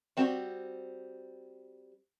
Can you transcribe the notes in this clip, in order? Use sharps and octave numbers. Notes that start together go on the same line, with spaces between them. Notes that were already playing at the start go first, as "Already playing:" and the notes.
G3 C4 F#4